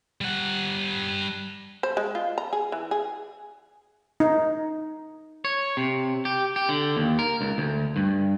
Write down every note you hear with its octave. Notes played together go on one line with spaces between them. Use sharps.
G3 F#5
C5
G#3
F4
A#5
G#4
E3
G#4
D#4
C#5
C3
G4
G4
D3
D#2
A#4
C#2
D2
G2